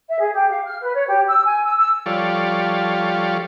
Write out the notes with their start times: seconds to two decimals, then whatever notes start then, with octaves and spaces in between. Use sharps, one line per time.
0.08 E5
0.20 G#4
0.33 G4
0.49 F5
0.66 F6
0.80 B4
0.94 C#5
1.08 G4
1.27 E6
1.44 G#5
1.63 E6
1.76 E6
2.06 F3 G3 F4 A4 C#5 D5